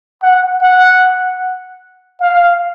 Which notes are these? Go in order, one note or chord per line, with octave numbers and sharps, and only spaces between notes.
F#5
F#5
F5